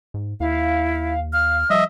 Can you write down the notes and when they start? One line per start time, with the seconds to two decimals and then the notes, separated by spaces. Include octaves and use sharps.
0.14 G#2
0.40 D#2 E4 F5
1.33 F5 F6
1.70 F3 G3 D#5 E5